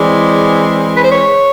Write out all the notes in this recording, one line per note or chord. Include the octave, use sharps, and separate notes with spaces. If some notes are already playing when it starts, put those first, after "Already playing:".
Already playing: E3 G#3 C4 D5
B4
C5
C#5